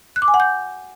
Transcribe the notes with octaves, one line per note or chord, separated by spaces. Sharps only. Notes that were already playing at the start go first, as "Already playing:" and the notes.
F#6
D6
G#5
F#5
G6